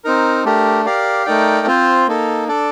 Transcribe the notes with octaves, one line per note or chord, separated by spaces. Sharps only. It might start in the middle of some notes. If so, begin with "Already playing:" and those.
C4 D#4 A#4
A3 D4 G4 A#4
G4 A#4 D5 F5
A3 D#4 A#4 D5 G5
C4 F4 C5
A#3 D#4 A4
D4 A4 D5